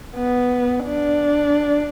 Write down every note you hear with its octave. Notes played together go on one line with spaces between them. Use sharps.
B3
D4